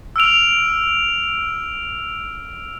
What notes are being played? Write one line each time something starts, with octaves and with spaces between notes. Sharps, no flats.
E6 F6 D7 F7